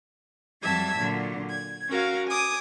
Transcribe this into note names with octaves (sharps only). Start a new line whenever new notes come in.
F2 F#3 G3 E5 A5 G#6
A#2 D3 F#3
G#6
C#4 F#4 A#4 F5
G#5 D6 D#6